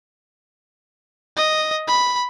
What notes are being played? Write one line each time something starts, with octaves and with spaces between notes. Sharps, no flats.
D#5
B5